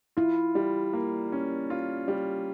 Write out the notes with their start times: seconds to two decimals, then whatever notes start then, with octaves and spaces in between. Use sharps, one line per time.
0.17 E4 F4
0.55 G3
0.93 A#3
1.32 C#4
1.70 F4
2.08 G3